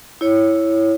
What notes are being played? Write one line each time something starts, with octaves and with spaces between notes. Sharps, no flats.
E4 C#5